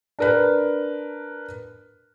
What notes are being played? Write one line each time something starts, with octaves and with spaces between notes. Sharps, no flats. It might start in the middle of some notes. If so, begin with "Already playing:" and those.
D4 A#4 B4